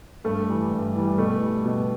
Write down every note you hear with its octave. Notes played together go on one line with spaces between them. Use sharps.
G2 A3
E3 G3
G2
E3 G3
B2 A3
G3
B2